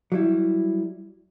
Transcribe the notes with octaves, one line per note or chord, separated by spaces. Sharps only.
F#3 G3 E4